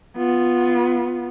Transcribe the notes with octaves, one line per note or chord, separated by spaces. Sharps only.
B3 F4